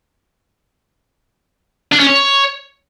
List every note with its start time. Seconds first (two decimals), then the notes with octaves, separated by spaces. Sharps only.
1.92 D4
1.99 C#4
2.07 C#5